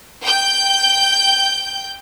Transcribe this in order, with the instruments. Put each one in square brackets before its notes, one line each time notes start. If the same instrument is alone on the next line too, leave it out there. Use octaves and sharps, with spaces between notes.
[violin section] G5 G6